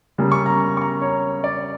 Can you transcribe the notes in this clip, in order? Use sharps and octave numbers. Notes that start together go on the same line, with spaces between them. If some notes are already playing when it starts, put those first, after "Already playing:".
C#3 G3 A#3
C#6
A#5
A#5
C#6
A#5
C#5
D5